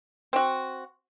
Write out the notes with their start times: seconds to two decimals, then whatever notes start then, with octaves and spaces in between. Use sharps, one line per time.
0.33 C4 F#4